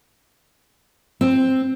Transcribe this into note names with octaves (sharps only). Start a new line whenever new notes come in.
C4